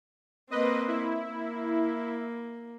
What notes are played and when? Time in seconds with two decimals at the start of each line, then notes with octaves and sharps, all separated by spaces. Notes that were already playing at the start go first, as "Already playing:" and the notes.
0.51 A#3 C4 B4 D#5
0.88 E4
1.32 A#3